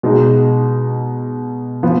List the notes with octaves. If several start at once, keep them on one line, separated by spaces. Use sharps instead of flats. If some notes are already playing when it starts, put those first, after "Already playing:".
B2 G#3 D#4
F3 B3